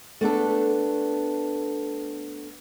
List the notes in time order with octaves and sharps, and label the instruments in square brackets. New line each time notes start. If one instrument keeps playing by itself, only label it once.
[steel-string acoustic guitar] A3 B3 D4 A4